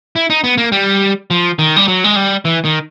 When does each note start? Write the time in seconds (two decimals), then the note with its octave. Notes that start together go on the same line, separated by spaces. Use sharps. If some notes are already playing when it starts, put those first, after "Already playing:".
0.16 E4
0.30 D#4
0.44 B3
0.58 A#3
0.72 G3
1.31 F3
1.59 D#3
1.76 G3
1.88 F#3
2.04 G#3
2.16 G3
2.45 E3
2.65 D#3